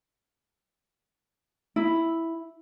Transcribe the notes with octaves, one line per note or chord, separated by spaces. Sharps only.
E4